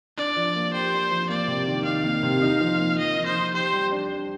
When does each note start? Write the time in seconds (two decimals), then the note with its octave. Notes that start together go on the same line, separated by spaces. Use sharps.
0.18 D4 D5
0.36 F3
0.55 A#3
0.73 G4 C5
0.93 D4
1.11 F3
1.29 A#3 D5
1.48 C3
1.67 D#3
1.85 D#4 F5
2.04 A#3
2.23 C3
2.42 D#4
2.61 F3
2.79 A#3
2.98 F3 D#5
3.17 D#4
3.26 C5
3.35 F3
3.54 G4 C5
3.73 G3
3.91 D4